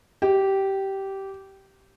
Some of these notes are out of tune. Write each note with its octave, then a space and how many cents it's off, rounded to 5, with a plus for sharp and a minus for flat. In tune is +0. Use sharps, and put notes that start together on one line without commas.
G4 -15